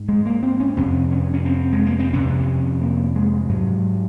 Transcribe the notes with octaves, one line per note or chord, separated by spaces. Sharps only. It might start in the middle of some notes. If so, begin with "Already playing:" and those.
Already playing: G#2
G#3
A#3
C4
C#4
F2 C3 C4
C#4
C#4
C4
G#3
A#3
C4
F2 C3 C#4
A#3
G#3
G#2 F#3